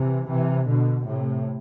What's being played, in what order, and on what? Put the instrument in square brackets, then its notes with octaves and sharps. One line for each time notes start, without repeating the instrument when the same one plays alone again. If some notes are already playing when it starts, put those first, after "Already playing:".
Already playing: [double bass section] C3 E3
C3 E3
B2 D3
A2 C3